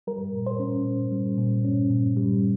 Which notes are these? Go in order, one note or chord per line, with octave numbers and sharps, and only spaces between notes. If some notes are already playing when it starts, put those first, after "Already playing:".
G3 A#4
A#2
C5
C#4
A#2
G3
A#2
C#4
A#2
G3